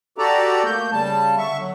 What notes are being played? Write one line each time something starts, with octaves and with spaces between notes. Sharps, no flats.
F#4 G4 A4 D5 A#5
A3 A#3 G6
C#3 G3 A5
D3 E5 C#6
F#3